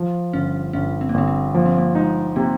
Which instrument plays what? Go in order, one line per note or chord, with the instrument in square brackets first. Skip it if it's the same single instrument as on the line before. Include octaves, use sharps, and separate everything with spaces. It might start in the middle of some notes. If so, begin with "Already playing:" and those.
Already playing: [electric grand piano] F3
[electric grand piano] G1 [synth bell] C#4
[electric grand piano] G1 [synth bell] C#4
[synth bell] C4
A#3
[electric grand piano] G1 [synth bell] C4
[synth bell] C4
[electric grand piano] F3 [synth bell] A#3
[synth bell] C4
A#3
[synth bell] G#3 [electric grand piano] D#4
[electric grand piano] C3 [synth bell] A#3